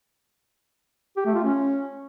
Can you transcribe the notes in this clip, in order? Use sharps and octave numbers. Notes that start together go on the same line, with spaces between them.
G4
A3
F4
C#4